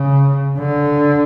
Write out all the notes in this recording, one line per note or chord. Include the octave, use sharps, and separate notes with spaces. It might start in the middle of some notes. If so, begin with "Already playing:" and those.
Already playing: C#3
D3